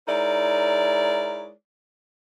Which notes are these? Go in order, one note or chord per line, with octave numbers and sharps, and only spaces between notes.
G#3 D#4 E4 A#4 C#5 D5